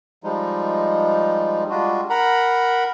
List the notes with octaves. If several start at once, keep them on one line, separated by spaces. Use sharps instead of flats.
F3 G3 G#3 D#4
G3 G#3 D4 F4 F#4
A#4 F#5 A#5 B5